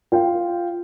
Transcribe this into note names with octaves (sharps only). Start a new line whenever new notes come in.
F4 G5